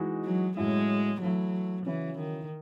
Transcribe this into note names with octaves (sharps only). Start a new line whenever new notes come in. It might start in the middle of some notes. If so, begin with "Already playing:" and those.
Already playing: E3 G#3 D#4 F#4
F#3
A2 F#3 G#3 C#4 E4
E3 F#3 A3 E4
C#3 E3 F#3 C#4 E4
D#3